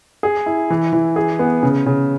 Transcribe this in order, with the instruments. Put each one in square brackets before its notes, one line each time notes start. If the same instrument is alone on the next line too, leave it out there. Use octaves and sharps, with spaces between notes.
[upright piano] G#4
E4
E3
E3
G#4
B3
C#3
C#3